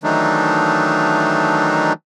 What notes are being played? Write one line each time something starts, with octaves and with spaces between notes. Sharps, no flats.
D#3 E3 F#3 A3 D4 D#4